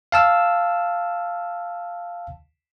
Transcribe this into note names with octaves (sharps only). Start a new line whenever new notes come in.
F5 A5 E6